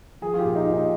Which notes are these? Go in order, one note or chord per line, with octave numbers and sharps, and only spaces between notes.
F3 G#4
F4
G4
A#2
D#4
A#2
D#4